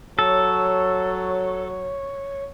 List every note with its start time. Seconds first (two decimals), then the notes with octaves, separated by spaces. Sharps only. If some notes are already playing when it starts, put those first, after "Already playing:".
0.19 F#3 A4 C#5